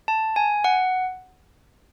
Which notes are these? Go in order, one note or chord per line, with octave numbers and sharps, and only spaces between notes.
A5
G#5
F#5